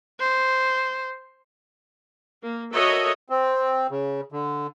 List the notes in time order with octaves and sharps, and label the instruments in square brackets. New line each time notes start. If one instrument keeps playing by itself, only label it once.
[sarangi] C5
[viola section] A#3
F#4 A4 A#4 C#5 D#5 E5
[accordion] C4
C#3
D3